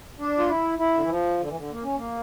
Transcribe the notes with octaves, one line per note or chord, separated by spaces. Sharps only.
D4
F4
E4
E4
D3
E3
F3
D3
E3
D3
A#3
C#4
A#3